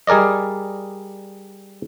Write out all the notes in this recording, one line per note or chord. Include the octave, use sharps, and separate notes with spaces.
G3 G#4 A#4 D5 D#5